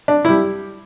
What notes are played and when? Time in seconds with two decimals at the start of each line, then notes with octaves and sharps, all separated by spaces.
0.08 D4
0.25 G3 E4